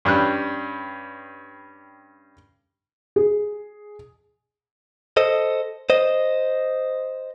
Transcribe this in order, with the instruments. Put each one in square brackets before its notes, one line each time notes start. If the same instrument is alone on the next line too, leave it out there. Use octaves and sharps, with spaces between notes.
[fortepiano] G2 G3 C#4 F#6
[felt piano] G#4
[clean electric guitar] A4 C5 D#5
C5 D#5